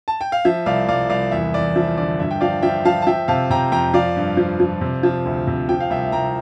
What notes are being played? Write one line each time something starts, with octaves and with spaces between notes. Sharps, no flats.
A5
G5
F5
F3 E5
C2 D5 F5
C2 D5 F5
C2 D5 F5
E2 E5
E2 D5
F3 E5
D3 D5
G2 E5
G5
F3 D5 F5
F3 E5 G5
F3 F5 A5
A5
F3 E5 G5
C3 F5 A5
C3 G5 A#5
F2 G5 A#5
F3 D5 F5
G2
F3
F3
C3
F3
D2
C3
F3 G5
F5
C2 E5 G5
C2 G5 A#5